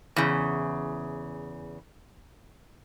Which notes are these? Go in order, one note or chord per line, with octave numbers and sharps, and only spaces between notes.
E2 C#3